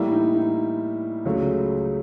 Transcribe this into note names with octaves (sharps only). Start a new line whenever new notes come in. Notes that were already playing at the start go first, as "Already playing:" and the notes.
Already playing: A2 E3 G3 A#3 E4
D#4
D#4
C#2 C#3 F#3 A3